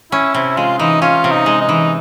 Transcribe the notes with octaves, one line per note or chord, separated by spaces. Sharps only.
C#4 E4
C3 E4
G#3 F4
E3 D#4
C#4 F4
C3
D#4
G#3
D#4
E3